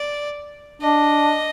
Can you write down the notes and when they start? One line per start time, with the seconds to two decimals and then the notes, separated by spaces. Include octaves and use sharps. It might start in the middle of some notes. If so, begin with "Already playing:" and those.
Already playing: D5
0.81 D4 D#5